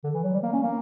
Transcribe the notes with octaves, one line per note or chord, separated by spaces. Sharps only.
D3
E3
F#3
G3
A#3
C#4
A#3